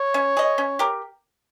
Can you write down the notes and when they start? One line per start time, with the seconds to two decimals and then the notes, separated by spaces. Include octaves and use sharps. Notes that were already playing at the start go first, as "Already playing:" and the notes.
Already playing: C#5
0.14 C#4
0.37 G#4 D#5
0.58 C#4
0.79 G4 A#4